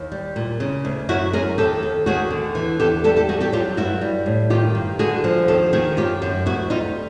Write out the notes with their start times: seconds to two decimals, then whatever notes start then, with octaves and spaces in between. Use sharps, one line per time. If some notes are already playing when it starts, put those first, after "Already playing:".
Already playing: D#2
0.12 G3
0.36 A#2
0.60 C#3
0.85 D2
1.09 F#2 E4 F#4
1.33 F#2 G#4 A#4
1.58 D#2 G4 A4
1.83 D#2
2.06 D#2 F#4 G#4
2.30 D3
2.55 E3
2.79 E2 G4 A4
3.04 G3 G4 A4
3.16 G4 A4
3.29 G3 F#4 G#4
3.41 G4 A4
3.52 F#3 F4 G4
3.77 G2 E4 F#4
4.01 G3
4.26 A2
4.50 D#3 F4 G4
4.75 G2
4.99 D3 F#4 G#4
5.24 F3
5.48 D#2 G4 A4
5.73 D#3 F#4 G#4
5.97 F#2 F4 G4
6.22 F#2
6.46 D2 E4 F#4
6.70 G3 D#4 F4